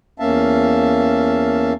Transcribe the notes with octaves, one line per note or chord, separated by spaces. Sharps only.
E2 A#3 C#4 E5 F5 A5